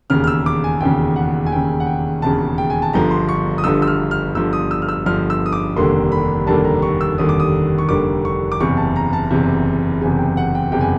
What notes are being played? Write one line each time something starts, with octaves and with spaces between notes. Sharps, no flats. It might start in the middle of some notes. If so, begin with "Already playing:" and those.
E1 D#2 C#3 F6
F6
E6
D6
G#5
E1 D#2 C#3 G5
F#5
G#5
E1 D#2 C#3 G5
F#5
G5
E1 D#2 C#3 A5
G5
G#5
A5
G1 G2 D3 F3 A#5
C6
C#6
D#6
G1 G2 D3 F3 E6
E6
F6
F6
G1 G2 D3 F3 E6
D#6
E6
F6
E6
G1 G2 D3 F3 F6
E6
D#6
D6
F1 D#2 D3 G3 A#3 C6
B5
F1 D#2 D3 G3 A#3 A5
A#5
C#6
E6
F1 D#2 D3 G3 A#3 D#6
D6
D#6
C#6
F1 D#2 D3 G3 A#3 D6
C#6
D6
F#1 E2 C3 C#6
A5
A#5
A5
F#1 E2 C3
F#1 E2 C3 G#5
G5
F#5
G5
F#1 E2 C3 G5
G#5